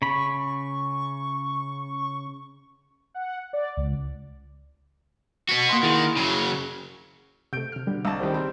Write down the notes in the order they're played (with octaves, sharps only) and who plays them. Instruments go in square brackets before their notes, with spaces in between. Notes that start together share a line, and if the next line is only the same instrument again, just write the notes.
[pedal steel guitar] C#3 B5 [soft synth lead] C#6
[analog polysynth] F#5
D5
C#2
[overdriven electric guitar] B3 F#4
[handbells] A#3 F#5 C6
[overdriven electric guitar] D#3 [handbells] E4 G#4
[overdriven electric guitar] C#3 F#3
[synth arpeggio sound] C3 A3 [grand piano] G6 D7
[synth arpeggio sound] C3 F6
[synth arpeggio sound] B2 G3 [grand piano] D3
[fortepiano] C2 A5 [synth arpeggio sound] D#5 A#5 E6
[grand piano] D#3 G3 C5 [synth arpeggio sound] C#4 E4
[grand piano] C#3 [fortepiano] G3 C4